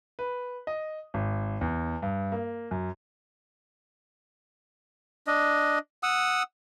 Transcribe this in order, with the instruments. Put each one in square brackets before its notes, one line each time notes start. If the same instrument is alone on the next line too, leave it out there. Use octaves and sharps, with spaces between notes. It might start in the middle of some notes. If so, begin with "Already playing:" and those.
[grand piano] B4
D#5
G#1
E2
G2
A#3
F#2
[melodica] D4 D#5
F#5 D#6 E6